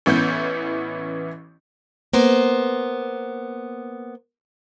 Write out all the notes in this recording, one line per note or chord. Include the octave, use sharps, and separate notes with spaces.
A1 E3 B3 C#4 G6
A#3 B3 C5